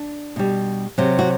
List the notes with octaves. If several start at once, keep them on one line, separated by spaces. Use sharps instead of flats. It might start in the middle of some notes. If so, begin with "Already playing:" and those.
Already playing: D4
B2 G3
C3 F#3
F#4